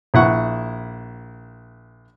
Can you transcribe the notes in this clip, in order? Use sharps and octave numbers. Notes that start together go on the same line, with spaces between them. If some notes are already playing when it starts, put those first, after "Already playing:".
A#1 E4 F#5 C#6